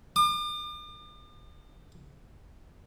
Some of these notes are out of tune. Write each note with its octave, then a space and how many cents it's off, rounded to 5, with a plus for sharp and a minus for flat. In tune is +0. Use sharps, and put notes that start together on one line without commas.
D6 +45